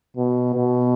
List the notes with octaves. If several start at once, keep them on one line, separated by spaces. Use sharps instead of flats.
B2
B2